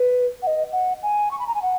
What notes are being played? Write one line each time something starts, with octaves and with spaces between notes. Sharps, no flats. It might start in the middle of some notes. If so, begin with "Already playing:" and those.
Already playing: B4
F#5
D#5
F#5
G#5
C#6
B5
A#5
G#5
F#5